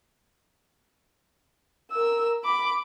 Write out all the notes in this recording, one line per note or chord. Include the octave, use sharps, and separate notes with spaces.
A#4 E6
B5 D6